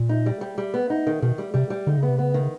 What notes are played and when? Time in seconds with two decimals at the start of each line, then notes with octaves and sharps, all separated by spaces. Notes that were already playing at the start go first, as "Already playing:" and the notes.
Already playing: A#2
0.09 D#4
0.26 G3
0.41 G3
0.58 G3
0.74 B3
0.90 D#4
1.07 D#3
1.22 B2 D#3
1.38 G3
1.54 C3 G3
1.70 G3
1.87 D3 D#4
1.97 C#3
2.03 B3
2.09 C3
2.19 C#3 B3
2.34 D#3